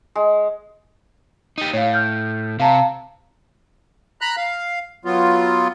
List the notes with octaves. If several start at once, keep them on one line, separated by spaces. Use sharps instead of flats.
G#3
D#4 G4
A2 C#5 F5
F6 G6
C3 F5 A5 A#5
A#5 B5 F#6
F5
F#3 B3 F4